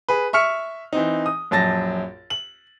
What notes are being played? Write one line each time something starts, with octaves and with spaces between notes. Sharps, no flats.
G#4 B4
E5 C#6 F6 C#7
E3 C4 D#4
D#6
A#1 F#2 A5 A6 A#6
F#7